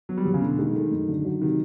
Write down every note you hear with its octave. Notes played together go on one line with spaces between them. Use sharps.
F#3 B3
G3
E2 F#3
C#3
B2 D3
D#3 G#3
D#3 A3
F#2
D3
F#3
C3 D#3